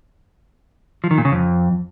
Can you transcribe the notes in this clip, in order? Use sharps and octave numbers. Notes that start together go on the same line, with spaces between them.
F3
D#3
A#2
C#3
F2